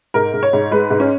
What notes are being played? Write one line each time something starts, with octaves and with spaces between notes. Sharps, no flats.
G#2 A#4
G#2
C#5
G#2
G#3 B4
G#2
C#4